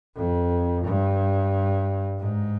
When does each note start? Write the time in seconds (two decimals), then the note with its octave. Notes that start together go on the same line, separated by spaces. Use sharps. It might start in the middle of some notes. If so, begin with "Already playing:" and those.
0.16 F2
0.84 G2
2.19 G#2